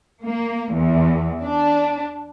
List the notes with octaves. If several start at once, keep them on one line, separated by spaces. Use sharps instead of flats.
A#3
E2
D4